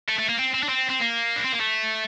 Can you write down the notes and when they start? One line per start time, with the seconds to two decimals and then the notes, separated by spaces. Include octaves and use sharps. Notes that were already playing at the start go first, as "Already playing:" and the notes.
0.09 A3
0.19 A3
0.29 A#3
0.39 C4
0.54 C4
0.63 D4
0.69 C4
0.89 C4
1.00 A#3
1.36 D4
1.44 C4
1.52 A#3
1.60 A3